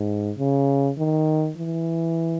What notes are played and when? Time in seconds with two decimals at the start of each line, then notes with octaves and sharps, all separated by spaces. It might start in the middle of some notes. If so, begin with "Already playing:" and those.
Already playing: G#2
0.38 C#3
0.98 D#3
1.57 E3